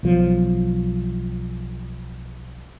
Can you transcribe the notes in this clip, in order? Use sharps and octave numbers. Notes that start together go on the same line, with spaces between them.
B1 F3 F#3